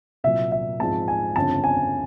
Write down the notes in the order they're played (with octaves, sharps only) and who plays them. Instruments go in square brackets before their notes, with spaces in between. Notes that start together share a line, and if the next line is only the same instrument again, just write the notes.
[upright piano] C2 A#2 F#3 [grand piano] E5
[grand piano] E5
[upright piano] G#2 F3 G#3 C4 [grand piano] A5
[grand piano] G#5
[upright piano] G1 F2 C#3 [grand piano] A5
[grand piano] G#5